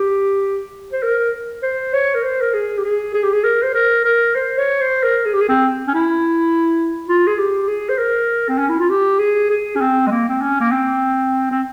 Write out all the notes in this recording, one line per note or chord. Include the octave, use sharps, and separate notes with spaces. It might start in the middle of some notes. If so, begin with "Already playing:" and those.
Already playing: G4
C5
A#4
C5
C#5
A#4
C5
A#4
G#4
G4
G#4
G#4
G4
G#4
A#4
C5
A#4
A#4
C5
C#5
C5
A#4
G#4
G4
G#4
C4
C#4
E4
F4
G#4
G4
G#4
C5
A#4
C4
C#4
E4
F4
G4
G#4
G#4
C#4
C4
G#3
A#3
C4
C#4
A#3
C4
C4